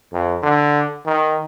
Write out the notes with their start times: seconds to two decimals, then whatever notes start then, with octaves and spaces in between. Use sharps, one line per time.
0.13 F2
0.43 D3
1.06 D#3